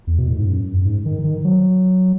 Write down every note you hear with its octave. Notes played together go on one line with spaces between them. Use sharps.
E2
B2
A2
G#2
F#2
G#2
D#3
D#3
F#3